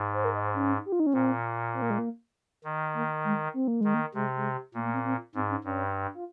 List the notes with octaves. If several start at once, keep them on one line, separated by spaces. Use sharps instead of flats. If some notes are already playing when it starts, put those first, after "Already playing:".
Already playing: G#2
C5
A#4
D#5
C5
C#4
G4
F4
D#4
C#4
A#2 C4
C4
A#3
G#3
A#3
D#3
A#3
G#3
C4
A#3
D#3 G#3
A#3
C3 G#3
G#3
A#2 A#3
A#3
C4
C4
G#2 C4
C#4
G2 C#4
F4